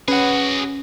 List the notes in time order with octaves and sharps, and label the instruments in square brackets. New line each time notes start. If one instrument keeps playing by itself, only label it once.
[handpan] C#4 [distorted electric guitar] F#4 G#4 [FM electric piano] B4 F#5